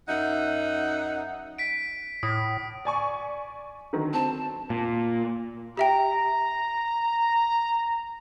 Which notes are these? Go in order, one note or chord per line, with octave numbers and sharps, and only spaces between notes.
F#2 D#4 E5 F#5
B6 D7
A2 D#6
D5 G#5 C#6
D3 D#3 F#3
C4 A5
A#2
G4 E5 G5 A#5